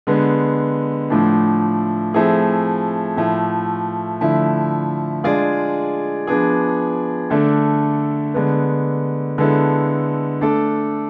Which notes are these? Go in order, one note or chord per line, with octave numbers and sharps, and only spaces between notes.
D3 G#3 B3
A2 F3 A3 D4
F3 A3 C4 E4 G#4
A2 F3 A3 E4
D3 F3 A3 E4
G#3 D4 F4 G#4 D5
F3 B3 D4 G#4
D3 A3 D4 A4
D3 G#3 B3
D3 G#3 B3 E4 A4
A3 D4 A4